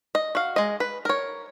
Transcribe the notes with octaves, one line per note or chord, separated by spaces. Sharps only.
D#5
F#4 F5
G#3 D#5
B4
A#4 C#5